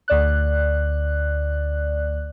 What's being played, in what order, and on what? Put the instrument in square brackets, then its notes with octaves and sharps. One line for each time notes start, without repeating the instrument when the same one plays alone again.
[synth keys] D2 D5 F#6